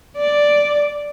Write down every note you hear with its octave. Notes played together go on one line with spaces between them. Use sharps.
D5